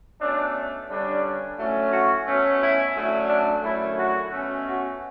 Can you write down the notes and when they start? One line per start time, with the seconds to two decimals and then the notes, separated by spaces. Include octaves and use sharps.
0.20 B2 A3 C#4 D4
0.89 G2 D3 G3 C#4 D4
1.57 A2 F#3 A3 C#4
1.92 F#4
2.27 B2 A3 C#4
2.61 E4
2.95 D3 F#3 A3 C#4
3.29 D4
3.63 F#2 D3 A3 C#4 E4
3.98 F#4
4.32 B2 A3 C#4
4.67 F#4